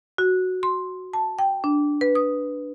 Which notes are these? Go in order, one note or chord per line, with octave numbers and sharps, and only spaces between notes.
F#4
C6
A5
G5
D4
B4
D#6